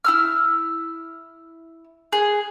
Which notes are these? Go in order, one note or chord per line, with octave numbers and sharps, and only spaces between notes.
E4 E6 F6
G#4